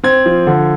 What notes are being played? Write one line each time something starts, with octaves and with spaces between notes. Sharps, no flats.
C4 G#6
F3
D3